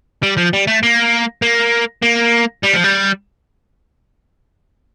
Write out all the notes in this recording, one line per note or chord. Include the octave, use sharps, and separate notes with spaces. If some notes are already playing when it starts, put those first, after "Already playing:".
G3
F3
G3
A3
A#3
A#3
A#3
G3
F3
G3